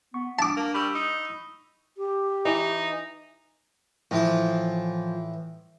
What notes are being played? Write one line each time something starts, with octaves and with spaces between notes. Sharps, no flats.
B3 C#6
D4 A5 D6
A#3
G3 B5 C#6 E6
D#4
G4
E3 D#4
A2 E3 F3 D#6